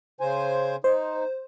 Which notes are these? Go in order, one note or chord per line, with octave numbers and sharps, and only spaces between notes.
C#3 C5 G#5
D#4 C5